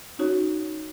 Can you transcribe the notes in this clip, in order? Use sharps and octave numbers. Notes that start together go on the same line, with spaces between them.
C#4 D#4 F#4 C#5